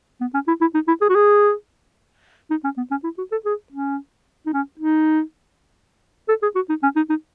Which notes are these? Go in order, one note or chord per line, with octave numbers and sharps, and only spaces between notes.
B3
C#4
E4
E4
D#4
E4
G#4
F#4
G#4
D#4
C#4
B3
C#4
E4
F#4
A4
G#4
C#4
D#4
C#4
D#4
A4
G#4
F#4
D#4
C#4
D#4
D#4